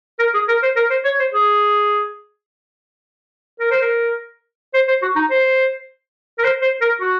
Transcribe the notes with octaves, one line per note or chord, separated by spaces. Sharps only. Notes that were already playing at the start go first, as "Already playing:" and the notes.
A#4
G#4
A#4
C5
A#4
C5
C#5
C5
G#4
A#4
C5
A#4
C5
C5
F#4
D#4
C5
A#4
C5
C5
A#4
F#4